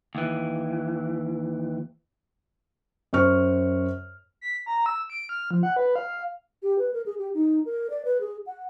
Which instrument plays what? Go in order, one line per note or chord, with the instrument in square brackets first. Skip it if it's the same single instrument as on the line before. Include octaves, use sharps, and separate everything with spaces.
[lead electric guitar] D#2 E3
[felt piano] F#2 C5 C#6 F6
[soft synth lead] B6
A#5
E6
D7
F6
F3
F#5
B4
F5
[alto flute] G4
B4
A#4
G#4
G4
D#4
A#4
D5
B4
G#4
F#5